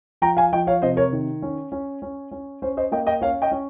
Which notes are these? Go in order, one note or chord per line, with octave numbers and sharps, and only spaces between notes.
F3 G5 A#5
F5 G#5
F3 D#5 G5
C#5 F5
C3 C5 D#5
A#4 C#5
D#3
C#4
C#4
C#4
C#4
C#4 C5
C5 D#5
A#3 D#5 G5
D#5 G5
C#4 C#5 F5
D#5 G5
C#4